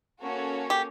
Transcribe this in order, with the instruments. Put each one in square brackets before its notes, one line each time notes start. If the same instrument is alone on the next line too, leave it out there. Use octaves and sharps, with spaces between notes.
[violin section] A#3 C#4 F#4 A4 C#5
[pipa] G4